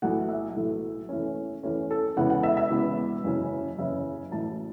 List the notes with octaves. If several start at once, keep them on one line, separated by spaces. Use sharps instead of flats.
B1 A2 E3 A3 F#5
E5
B1 A2 E3 A3
E2 E3 A3 C#4
E2 E3 A3 C#4
A4
E1 E2 C#3 E3 B3 F#5
F#5
E5
E5
E1 E2 C#3 E3 B3
F#1 E2 C#3 E3 C#4
F#1 E2 C#3 E3 C#4 E5
A1 A2 F#3 A5